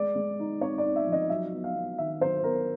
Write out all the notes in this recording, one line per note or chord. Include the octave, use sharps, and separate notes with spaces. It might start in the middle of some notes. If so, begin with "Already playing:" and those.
Already playing: G#3 D5
G#3
D#4
C4 C#5
D5
D#4
E5
F3
D#5
F#3 E5
B3
F5
B3
D#3 E5
F#3 C5
B3 A#4